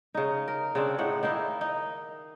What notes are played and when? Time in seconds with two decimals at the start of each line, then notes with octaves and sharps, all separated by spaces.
0.15 C#3 D#4
0.48 A#4
0.75 C#3 C4 D4
0.98 A2 C#3 D#4 F#5
1.23 D#3 A#3 D#4 E4
1.61 D#4